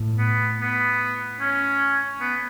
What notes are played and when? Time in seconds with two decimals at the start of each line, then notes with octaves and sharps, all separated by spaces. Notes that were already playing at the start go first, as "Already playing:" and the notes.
Already playing: A2
0.18 B3
0.61 B3
1.40 C#4
2.20 B3